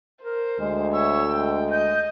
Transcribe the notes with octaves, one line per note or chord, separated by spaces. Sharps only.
A#4 C5
D2 G#3
C#5 E5 E6
G#3 G5
D#5 G6